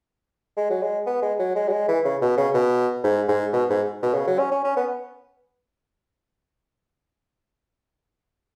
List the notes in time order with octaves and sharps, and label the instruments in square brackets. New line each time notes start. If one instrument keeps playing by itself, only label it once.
[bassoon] G#3
F#3
G#3
B3
G#3
F#3
G#3
F#3
G#3
E3
C#3
B2
C#3
B2
G#2
G#2
B2
G#2
B2
C#3
F#3
C#4
C#4
C#4
B3